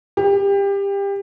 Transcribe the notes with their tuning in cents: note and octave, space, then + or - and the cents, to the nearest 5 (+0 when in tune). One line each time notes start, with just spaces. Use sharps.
G4 +25